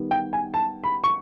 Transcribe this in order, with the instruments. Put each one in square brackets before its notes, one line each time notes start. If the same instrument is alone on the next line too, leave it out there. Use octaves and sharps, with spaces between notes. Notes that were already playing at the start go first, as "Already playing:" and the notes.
Already playing: [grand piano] D#3 G3 B3
G5
G#5
A5
B5
C#6